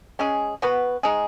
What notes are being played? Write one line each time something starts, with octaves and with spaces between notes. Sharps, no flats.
G#3 C#4 G#4
B3 F#4 B4
G#3 D#4 G#4